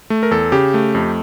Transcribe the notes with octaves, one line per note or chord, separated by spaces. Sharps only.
A3
A#4
E2 A4
C#3 G4
A3
F2